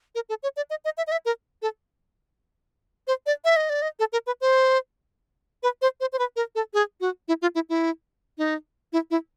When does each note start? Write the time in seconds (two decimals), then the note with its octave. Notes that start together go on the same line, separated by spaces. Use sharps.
0.15 A#4
0.29 A4
0.43 C#5
0.57 D5
0.70 D#5
0.85 D#5
0.98 E5
1.07 D#5
1.12 E5
1.25 A#4
1.62 A4
3.07 C5
3.26 D5
3.45 E5
3.56 D#5
3.70 D5
3.82 D#5
3.99 A4
4.13 A#4
4.27 B4
4.41 C5
5.63 B4
5.82 C5
6.00 C5
6.13 C5
6.19 B4
6.36 A#4
6.55 A4
6.74 G#4
7.01 F#4
7.28 E4
7.42 F4
7.55 E4
7.69 E4
8.38 D#4
8.93 E4
9.11 E4